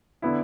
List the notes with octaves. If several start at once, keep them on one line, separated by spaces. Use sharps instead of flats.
D3 B3 E4